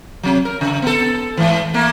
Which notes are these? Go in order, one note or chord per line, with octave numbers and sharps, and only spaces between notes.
C3 F#3
A#4
C#3
B3 A4
G#2 E3
A3 A#3